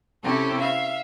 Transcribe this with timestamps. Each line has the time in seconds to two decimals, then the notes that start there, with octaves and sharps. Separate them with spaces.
0.23 C3 C4 C#4 E4 G4 A4
0.60 E5 F5